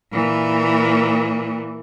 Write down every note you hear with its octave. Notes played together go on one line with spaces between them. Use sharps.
A#2 E3